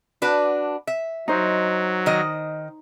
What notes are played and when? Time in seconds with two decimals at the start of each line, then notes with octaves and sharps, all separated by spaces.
0.22 D4 F#4 B4
0.87 E5
1.28 F#3 D#4 C5
2.06 D#3 D#5